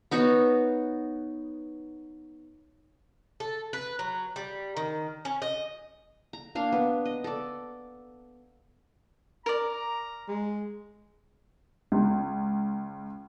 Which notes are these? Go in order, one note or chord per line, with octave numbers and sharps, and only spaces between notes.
B3 D#4 F#4 C#5
A4
B4
F#3
G3
D#3
C#4
D#5
A#5
A#3 D4 F5
B3
D#5
A4 D5
A#4 D5 A#5
G#3
C#2